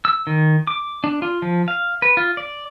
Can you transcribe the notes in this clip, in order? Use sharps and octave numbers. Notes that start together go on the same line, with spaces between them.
E6
D#3
D6
D4
F4
F3
F5
B4
F4
D5